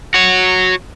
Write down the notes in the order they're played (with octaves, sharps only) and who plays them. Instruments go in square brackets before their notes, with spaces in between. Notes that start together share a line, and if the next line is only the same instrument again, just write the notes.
[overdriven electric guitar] F#4 C#5